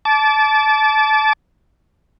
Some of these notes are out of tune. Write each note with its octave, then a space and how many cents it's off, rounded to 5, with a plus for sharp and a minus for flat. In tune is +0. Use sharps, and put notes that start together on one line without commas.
A5 -25 D6 -20